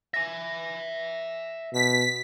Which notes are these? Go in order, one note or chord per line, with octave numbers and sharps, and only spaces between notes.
E5 G#5 A#6
B2 B6